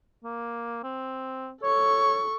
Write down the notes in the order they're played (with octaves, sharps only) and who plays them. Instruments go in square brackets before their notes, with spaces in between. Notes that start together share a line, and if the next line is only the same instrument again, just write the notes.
[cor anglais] A#3
C4
[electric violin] A4 C#6 [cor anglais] C#5